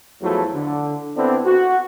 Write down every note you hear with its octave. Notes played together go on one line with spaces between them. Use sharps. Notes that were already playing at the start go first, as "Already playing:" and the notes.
E2 F3 F#3 A3 E4
D3
D3 B3 C4 D4 E4
F#4